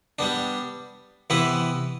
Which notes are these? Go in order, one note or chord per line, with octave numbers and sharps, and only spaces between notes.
G3 B3 D4
C3 E3 B3 E4 B4